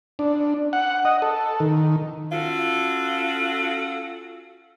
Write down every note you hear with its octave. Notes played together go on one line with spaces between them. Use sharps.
D4
F#5
D#5
A4
D#3
C#4 F4 F#4 A4